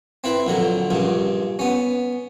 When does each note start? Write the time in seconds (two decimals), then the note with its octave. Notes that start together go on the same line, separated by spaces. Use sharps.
0.24 C4 E4 B4
0.47 A#1 D3 F#3
0.90 A#1 G2 C#3
1.59 B3 C#4